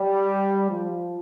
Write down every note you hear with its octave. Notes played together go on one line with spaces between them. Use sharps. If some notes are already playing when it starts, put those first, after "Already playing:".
Already playing: G3
F3